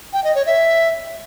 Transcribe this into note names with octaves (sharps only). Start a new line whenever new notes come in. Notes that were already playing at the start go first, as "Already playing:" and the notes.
G5
D#5
C#5
E5